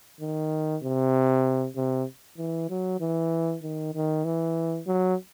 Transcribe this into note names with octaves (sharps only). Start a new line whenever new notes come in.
D#3
C3
C3
E3
F#3
E3
D#3
D#3
E3
F#3